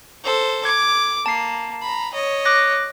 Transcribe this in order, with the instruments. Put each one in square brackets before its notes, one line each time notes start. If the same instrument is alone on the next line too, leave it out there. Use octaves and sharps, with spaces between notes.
[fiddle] A4 C5
[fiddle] D6 [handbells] G#6
[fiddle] A#3 [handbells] A5 C7
[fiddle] A#5 B5
C#5 D#5
[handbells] D6 F#6 A#6